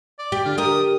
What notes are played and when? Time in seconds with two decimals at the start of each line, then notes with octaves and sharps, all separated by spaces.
0.19 D5
0.32 G4
0.45 D3 F4
0.58 G4 A#4 D#6